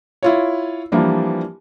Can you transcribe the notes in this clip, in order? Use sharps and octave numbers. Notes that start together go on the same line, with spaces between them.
E4 F4 C#5
E3 F3 G3 A#3 D4